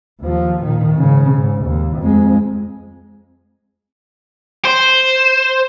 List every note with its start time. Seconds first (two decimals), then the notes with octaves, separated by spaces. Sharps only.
0.21 D#2 F3
0.64 A#2 D#3
0.95 G#2 C#3
1.34 G#2
1.65 D#2
1.98 F2 G#3
4.65 C5